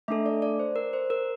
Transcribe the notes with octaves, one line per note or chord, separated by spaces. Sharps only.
A3 D4 A4 E5
D5
D5
C5
A#4
C5
A#4